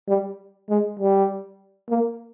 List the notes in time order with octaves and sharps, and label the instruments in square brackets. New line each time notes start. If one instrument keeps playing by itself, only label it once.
[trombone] G3
G#3
G3
A#3